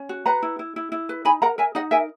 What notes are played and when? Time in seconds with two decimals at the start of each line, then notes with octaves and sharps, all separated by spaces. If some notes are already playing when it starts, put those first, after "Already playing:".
Already playing: C#4
0.09 F#4
0.26 B4 F#5 A#5
0.43 E4
0.59 E4
0.76 E4
0.92 E4
1.09 B4
1.25 D#4 G#5 B5
1.42 A#4 F#5 A#5
1.58 A#4 E5 G#5
1.75 D#4 D#5 F#5
1.91 A#4 E5 G#5